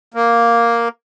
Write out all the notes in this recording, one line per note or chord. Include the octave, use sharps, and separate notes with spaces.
A#3